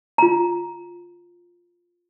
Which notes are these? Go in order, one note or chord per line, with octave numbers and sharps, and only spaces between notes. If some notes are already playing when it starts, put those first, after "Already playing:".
F4 A#5